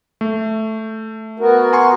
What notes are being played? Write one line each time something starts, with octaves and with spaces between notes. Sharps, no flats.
A3
B3 F#4 A#4
G#5 C6 C#6